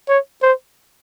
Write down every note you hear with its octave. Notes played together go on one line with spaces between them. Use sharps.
C#5
C5